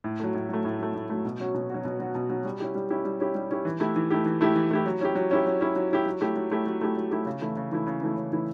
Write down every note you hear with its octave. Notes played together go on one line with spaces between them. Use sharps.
A2
F#3 A3
A2
F#3 A3
A2
F#3 A3
A2
F#3 A3
B2
F#3 C#4 F#4
B2
F#3 C#4 F#4
B2
F#3 C#4 F#4
B2
F#3 C#4 F#4
G3
C#4 E4 G4
G3
C#4 E4 G4
G3
C#4 E4 G4
G3
C#4 E4 G4
E3
A3 E4 G4
E3
A3 E4 G4
E3
A3 E4 G4
E3
A3 E4 G4
F#3
C#4 E4 G4
F#3
C#4 E4 G4
F#3
C#4 E4 G4
F#3
C#4 E4 G4
F#3
A3 E4 G4
F#3
A3 E4 G4
F#3
A3 E4 G4
F#3
A3 E4 G4
C#3
E3 A3 E4
C#3
E3 A3 E4
C#3
E3 A3 E4
C#3
E3 A3 E4